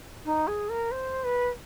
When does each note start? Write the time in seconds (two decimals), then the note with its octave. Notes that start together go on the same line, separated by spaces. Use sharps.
0.25 D#4
0.47 G#4
0.69 A#4
0.91 C5
1.24 B4